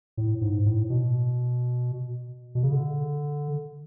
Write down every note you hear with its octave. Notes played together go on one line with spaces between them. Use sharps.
A2
G#2
A2
B2
B2
C#3
D3